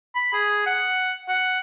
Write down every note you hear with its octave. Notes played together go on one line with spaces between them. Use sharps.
B5
G#4
F#5
F#5